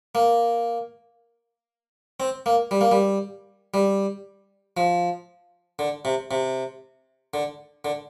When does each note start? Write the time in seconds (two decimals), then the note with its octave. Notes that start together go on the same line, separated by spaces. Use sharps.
0.15 A#3
2.20 C4
2.46 A#3
2.71 G3
2.81 A#3
2.92 G3
3.74 G3
4.77 F3
5.79 D3
6.05 C3
6.31 C3
7.34 D3
7.85 D3